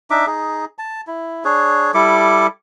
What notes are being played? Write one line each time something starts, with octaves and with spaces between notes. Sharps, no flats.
D4 D#4 E5 D6
D#4 G#4
A5
E4
D4 G#4 C#5
G3 E4 A4 D6